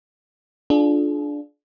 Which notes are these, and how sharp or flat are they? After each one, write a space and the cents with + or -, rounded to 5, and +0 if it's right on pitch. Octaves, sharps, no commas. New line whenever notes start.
D4 +0 F4 +0 G#4 +45